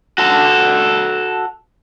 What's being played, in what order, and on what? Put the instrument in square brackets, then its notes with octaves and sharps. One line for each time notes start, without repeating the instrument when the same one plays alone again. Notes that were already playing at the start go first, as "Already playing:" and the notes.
[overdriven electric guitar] F#4 A4